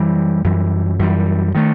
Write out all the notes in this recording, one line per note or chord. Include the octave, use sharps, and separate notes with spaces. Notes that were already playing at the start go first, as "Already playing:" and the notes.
Already playing: F#2 E3 G3
F#2 E3 G3
F#2 E3 G3
D#3 A3